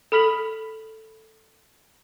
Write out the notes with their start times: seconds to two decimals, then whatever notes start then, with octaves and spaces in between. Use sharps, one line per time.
0.12 A4 B5 F6 B6 F#7